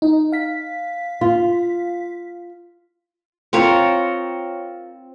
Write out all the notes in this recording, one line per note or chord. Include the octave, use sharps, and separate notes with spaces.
D#4
F5 B6
F4
C4 F4 A#4 C#5